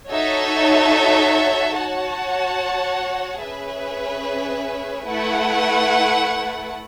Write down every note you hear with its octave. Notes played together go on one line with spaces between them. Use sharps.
D#4 F#4 A4 C#5 E5
F#4 C#5 F#5 A5
C#4 G#4 B4 E5
A3 E4 B4 F#5